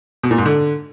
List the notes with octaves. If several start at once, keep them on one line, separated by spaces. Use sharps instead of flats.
B2
A#2
G#2
D3